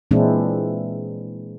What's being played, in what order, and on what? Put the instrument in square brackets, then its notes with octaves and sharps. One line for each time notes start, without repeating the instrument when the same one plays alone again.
[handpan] A#2 E3 G#3 C4 D4 E4